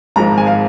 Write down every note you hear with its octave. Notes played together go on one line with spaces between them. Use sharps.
G#1 G#2 F3 G#3 A#5
G#5
F5